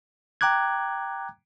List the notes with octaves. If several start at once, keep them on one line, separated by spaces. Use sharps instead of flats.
G5 A#5 D6 F#6 G#6